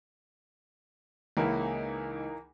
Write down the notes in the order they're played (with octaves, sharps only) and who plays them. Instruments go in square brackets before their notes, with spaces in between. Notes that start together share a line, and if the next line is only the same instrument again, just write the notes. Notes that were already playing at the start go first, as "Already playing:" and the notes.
[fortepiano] C#2 E4 [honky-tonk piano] E3 A#3 D#4